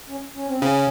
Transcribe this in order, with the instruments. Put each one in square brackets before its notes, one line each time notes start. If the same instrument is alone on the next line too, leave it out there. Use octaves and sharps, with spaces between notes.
[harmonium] C#4
C#4
C4
[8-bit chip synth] C#3 [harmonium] C#4